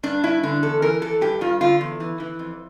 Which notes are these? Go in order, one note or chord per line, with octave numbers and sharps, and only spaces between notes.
G2 D4
G2 E4
D3 D4
E2 A4
E3 A#4
E3 A4
G2 G4
G2 F4
D3 F4
E2
E3
E3
F2